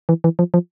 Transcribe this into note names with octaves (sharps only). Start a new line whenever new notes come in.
E3
E3
F3
F3